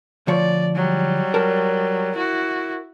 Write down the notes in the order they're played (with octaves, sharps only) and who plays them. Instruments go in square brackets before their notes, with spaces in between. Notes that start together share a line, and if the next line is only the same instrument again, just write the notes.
[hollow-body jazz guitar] D2 F3 C#5 [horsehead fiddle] D5
[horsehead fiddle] F#3 G3
[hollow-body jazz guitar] A#4 A5
[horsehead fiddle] E4 F#4